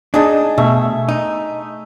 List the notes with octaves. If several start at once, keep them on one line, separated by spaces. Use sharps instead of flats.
D4 D#4 G#4 D#5 A5
B2 A3 E5
D#4